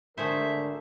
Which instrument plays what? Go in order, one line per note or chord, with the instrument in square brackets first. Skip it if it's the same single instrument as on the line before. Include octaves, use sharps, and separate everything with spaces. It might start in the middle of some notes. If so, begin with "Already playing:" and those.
[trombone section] G#1 D3 A#4 [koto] A3 G#4 C5 [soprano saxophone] E5